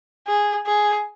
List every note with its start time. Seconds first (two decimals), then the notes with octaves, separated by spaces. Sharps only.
0.27 G#4
0.66 G#4